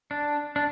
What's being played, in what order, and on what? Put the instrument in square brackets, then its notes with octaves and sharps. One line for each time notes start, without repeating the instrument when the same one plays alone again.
[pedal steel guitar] D4
D4